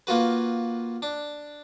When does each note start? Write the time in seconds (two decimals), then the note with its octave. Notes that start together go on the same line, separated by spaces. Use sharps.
0.07 A#3 F4 F#4 B4
1.02 D4